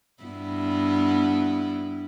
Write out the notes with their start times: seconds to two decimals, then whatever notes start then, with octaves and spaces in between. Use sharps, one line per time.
0.23 G2 B3 E4